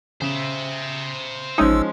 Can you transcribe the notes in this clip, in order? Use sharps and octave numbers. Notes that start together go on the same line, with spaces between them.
C#3 C5 E5
A1 F3 G#3 C#4 D#4 E6